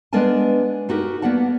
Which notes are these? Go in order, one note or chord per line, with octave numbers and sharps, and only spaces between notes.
G#3 B3 D4 A#4 G#5 A5
D#4 F#4 G4 A#4
A#3 B3 D5 F#5 A5